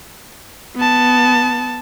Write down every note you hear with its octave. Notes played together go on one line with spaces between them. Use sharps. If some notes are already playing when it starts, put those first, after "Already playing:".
B3 A5